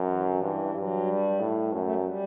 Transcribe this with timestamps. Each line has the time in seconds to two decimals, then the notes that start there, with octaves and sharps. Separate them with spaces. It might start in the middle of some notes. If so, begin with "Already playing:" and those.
Already playing: F#2
0.09 E3
0.21 D3
0.34 E3
0.41 G2
0.74 G2 F#3
1.06 G3
1.39 A2
1.72 F#2 A3
1.83 A3
1.94 G3
2.05 G3